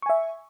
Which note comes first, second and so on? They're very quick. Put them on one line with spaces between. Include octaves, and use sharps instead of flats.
C#6 G#5 E5